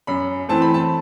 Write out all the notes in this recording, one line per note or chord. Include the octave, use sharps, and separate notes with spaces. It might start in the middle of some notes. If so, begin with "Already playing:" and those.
F#2 B5
E3 A3 C4 A5
B5
A5